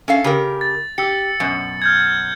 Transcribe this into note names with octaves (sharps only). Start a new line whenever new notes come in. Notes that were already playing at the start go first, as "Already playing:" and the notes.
C#4 A4 F5
C#3 G4 A#4
A6
G4 E6 C#7
F#2 B2
F6 G6 G#6